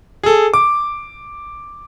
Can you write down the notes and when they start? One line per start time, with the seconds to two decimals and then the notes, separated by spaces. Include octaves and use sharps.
0.23 G#4 A4
0.54 D6